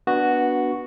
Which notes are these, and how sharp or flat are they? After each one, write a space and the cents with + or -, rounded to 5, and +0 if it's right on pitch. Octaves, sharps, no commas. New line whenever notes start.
B3 -15 D4 +0 F#4 +0